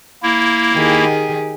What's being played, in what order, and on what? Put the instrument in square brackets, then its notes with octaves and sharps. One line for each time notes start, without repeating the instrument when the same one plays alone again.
[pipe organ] A#3 E4
[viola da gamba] D#3 G4 G#4